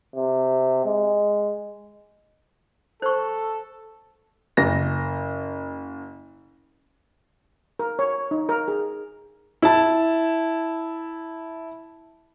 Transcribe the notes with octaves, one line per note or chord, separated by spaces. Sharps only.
C3
G#3
A4 C5 C#6
F#1 A#6
A#4
C#5
D#4
A#4
G#4
E4 A5